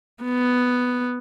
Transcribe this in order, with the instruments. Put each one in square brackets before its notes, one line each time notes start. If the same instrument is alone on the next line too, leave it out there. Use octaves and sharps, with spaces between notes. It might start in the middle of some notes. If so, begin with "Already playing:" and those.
[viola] B3